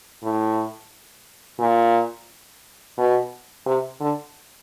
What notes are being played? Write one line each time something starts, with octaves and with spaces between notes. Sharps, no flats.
A2
A#2
B2
C3
D3